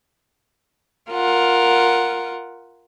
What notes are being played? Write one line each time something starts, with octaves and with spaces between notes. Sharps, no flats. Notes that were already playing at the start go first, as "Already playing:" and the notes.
F4 A#4 F#5